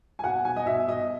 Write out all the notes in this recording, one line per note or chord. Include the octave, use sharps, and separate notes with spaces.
G#5
B2 F#5
B2 G#5
D#5
B2 E5
B2 D#5